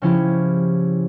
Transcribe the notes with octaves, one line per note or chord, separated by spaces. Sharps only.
C#3 F3 C#4 E4 G4